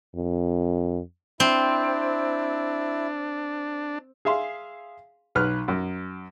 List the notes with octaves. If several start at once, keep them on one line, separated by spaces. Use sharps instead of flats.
F2
C4 D4 E4
G#4 E5 F5 C6
B1 B4 F6 F#6
F#2